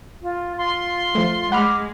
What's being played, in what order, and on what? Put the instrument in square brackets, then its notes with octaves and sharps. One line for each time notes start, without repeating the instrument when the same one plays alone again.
[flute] F4
[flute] F4 [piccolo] C6
[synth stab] F3 A3
[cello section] G#3 [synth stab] F#5 B5 F6 [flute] D6